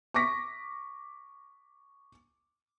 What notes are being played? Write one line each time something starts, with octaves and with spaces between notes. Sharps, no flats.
C#6 D6 A#6 B6